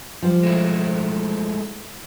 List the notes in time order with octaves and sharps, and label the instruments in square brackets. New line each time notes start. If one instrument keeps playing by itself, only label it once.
[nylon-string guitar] F3 G3 C5
[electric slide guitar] G#3 A3 E4